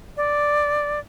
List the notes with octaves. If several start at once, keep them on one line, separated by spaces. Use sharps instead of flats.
D5